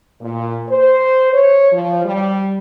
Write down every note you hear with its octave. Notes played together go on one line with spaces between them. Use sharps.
A#2
C5
C#5
F3
G3